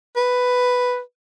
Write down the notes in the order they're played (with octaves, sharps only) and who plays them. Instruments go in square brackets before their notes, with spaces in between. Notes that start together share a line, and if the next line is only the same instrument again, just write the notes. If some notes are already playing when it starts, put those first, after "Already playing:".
[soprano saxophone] B4